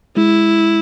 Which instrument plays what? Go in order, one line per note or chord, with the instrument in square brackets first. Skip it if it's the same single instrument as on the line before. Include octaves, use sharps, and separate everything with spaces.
[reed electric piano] G#3 [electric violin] E4